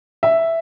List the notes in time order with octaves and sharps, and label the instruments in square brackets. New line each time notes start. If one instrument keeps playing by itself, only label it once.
[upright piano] E5